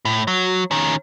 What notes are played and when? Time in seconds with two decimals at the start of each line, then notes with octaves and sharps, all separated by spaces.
0.05 A2
0.27 F#3
0.71 D#3 C#4